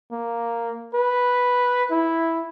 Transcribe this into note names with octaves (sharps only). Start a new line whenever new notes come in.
A#3
B4
E4